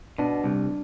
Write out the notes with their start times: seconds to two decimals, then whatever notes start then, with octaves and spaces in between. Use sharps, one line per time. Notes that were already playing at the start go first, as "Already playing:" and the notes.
0.18 B2 D4
0.44 C2